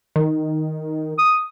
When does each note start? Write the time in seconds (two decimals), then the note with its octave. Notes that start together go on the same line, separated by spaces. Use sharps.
0.16 D#3
1.18 D#6